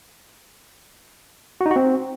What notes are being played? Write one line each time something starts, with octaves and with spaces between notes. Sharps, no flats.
F#4
D#4
F#4
C4